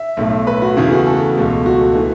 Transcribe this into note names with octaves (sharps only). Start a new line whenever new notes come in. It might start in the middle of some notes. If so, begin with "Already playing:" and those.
Already playing: E5
B1 A2 A3
B4
F#4
E2 C#3 E3 A3
F#4
A4
C#2 B2 A3
F#4
A4
E3 A3